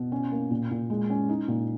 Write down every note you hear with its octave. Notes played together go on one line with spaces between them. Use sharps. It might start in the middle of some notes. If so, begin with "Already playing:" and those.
Already playing: B2
C#4
A#3
A#2
A#2
G#3
C#4
D#4
A#2